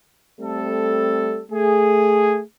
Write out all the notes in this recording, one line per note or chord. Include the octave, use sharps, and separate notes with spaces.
G3 A3 C4 A4
A3 G#4